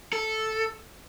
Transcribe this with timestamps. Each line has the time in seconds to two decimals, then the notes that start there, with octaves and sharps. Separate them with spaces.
0.13 A4